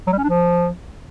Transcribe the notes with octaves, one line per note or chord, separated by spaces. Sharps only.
F#3
G3
C#4
D4
F3